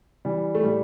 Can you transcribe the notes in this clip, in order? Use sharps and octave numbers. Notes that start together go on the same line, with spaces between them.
E3 G3
A3
A2 G3